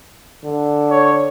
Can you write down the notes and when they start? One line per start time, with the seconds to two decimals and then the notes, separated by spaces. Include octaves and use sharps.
0.45 D3
0.90 C#5